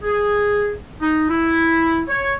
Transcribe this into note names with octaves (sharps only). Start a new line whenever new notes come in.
G#4
D#4
E4
C#5